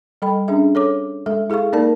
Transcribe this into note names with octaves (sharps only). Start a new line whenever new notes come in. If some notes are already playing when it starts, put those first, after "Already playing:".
G3 A4 D#5 G5 B5
C#4 D4 G#4 E5
A4 C#5 D6
G#3 A4 E5
E4 G#4 A4 F5 C#6
A#3 D#4 A#4 D5 A5